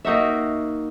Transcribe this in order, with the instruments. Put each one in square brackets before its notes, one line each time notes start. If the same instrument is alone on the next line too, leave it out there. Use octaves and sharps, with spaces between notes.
[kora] A#3 D#4 F#4 E5